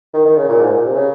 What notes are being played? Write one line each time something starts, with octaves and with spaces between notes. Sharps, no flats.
D#3
D#3
C#3
A#2
G#2
A#2
C3
C#3